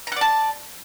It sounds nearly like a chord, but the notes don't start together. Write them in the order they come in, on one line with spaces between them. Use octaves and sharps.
A#5 F#5 D5 A5